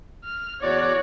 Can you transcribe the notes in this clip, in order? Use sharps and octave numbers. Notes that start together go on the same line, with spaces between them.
F6
E2 F#4 C#5 D5 D6